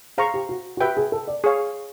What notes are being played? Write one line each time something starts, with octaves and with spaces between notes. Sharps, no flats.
G#4 C5 F5 A#5 C#6
G4
F#4
F#4
G4 B4 E5 G5
G#4
A4
D5
G#4 C#5 F5